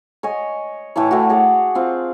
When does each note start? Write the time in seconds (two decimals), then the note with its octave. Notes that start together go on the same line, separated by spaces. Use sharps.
0.23 C#5 D#5 G#5
0.96 A2 E3 A3 C#5
1.11 A2 A3 F#4
1.30 G#4 C#5 D5 F#5
1.75 C4 F4